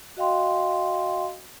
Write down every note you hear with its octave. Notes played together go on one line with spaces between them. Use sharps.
F#4 D#5 F5 G5 C6